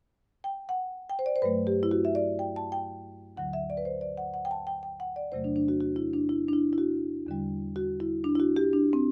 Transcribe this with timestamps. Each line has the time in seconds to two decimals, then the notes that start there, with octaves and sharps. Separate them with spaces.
0.44 G5
0.69 F#5
1.10 G5
1.19 C5
1.26 D5
1.36 C5
1.42 G2 F#3 A3 B4
1.67 G4
1.83 E4
1.91 F#4
2.05 E5
2.15 D5
2.39 G5
2.56 A5
2.72 G5
3.37 D2 D3 F#3 F#5
3.53 E5
3.70 D5
3.77 B4
3.85 C5
4.01 D5
4.17 F#5
4.34 F#5
4.45 G5
4.51 A5
4.67 G5
4.83 G5
5.00 F#5
5.16 D5
5.32 E2 C3 F#3 A3 C5
5.44 D4
5.56 D4
5.68 F#4
5.80 F#4
5.96 E4
6.14 D4
6.29 E4
6.49 D4
6.53 E4
6.73 E4
6.78 F#4
7.26 E2 D3 G3
7.76 F#4
8.00 E4
8.24 D4
8.35 E4
8.40 F#4
8.56 G4
8.73 D4
8.93 C4